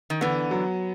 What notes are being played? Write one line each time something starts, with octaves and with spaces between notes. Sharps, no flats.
D#3
D3 E3 B3
F#3